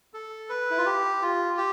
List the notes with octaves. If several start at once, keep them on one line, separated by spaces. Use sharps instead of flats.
A4
B4
E4
F4
G4
F4
G4